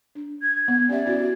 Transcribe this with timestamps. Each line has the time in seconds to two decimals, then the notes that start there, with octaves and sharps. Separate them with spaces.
0.15 D4
0.42 G#6
0.68 B3
0.89 C#4 G4 D5 E5
1.06 C#4 E4 F#4